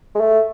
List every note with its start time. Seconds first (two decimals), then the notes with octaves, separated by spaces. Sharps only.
0.15 G#3
0.20 A3